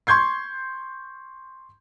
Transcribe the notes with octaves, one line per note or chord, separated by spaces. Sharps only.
C6 C#6 G6 G#6 C7